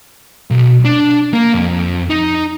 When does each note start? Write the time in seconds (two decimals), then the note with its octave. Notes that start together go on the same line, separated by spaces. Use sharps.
0.51 B1
0.85 D4
1.33 A#3
1.55 F2
2.10 D#4